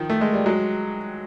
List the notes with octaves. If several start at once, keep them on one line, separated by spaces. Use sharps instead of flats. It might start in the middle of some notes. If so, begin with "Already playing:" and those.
Already playing: D#3 F3
A3
G#3
G3
F#3 G#3